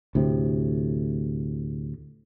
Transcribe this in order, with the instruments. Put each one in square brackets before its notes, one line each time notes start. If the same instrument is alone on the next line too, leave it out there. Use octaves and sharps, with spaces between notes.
[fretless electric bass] D2 A2 C3